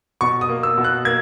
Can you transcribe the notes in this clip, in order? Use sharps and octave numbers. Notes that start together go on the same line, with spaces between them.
B2 C#6
D#6
A#3
E6
B2
F#6
A#3 G#6